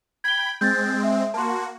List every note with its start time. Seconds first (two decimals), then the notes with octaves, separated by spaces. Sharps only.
0.24 G5 B5 G#6 G7
0.61 G#3 C4 G6 A6
1.04 E5
1.34 A#3 F#4 A5 C6